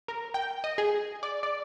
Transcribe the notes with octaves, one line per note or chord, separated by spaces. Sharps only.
A#4
G5
D#5
G#4
D5
D5